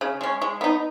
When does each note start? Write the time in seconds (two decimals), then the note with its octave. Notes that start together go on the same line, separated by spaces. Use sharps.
0.01 C#3
0.21 G#3 C#4
0.42 G#3
0.61 B3 D#4